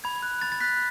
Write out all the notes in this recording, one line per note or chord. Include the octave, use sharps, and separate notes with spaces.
B5 G#6
F#6
B5 A6
A6
F#6 B6